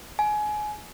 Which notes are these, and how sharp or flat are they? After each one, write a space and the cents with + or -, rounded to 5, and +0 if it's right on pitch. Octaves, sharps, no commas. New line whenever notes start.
G#5 +25